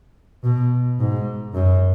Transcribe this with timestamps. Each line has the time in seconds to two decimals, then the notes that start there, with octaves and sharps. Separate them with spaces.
0.44 B2
1.00 G#2
1.54 F#2